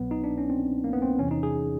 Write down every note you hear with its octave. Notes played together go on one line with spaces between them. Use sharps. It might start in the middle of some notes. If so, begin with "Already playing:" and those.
Already playing: C2 B2 F#3 B3
D#4
D4
C#4
C4
A#3
B3
C4
E2 C3 E3 C#4
D#4
G#4